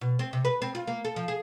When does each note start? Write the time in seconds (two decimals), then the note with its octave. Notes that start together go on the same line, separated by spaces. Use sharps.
0.01 B2
0.19 C4
0.33 C3
0.45 B4
0.62 C4
0.75 F4
0.87 A#3
1.05 A4
1.16 F3
1.28 G#4